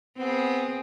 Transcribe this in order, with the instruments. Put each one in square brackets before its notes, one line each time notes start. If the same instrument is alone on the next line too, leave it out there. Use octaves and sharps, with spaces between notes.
[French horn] B3 [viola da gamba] C4 G#4